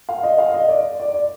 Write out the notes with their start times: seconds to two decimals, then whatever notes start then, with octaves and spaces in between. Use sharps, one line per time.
0.09 F5
0.23 D#5
0.38 F5
0.54 D#5
0.69 D5
0.99 D5
1.14 D5